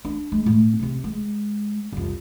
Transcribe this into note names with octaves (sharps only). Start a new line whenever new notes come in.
D4
G#3
A2
C3 C4
G#3
C2 F2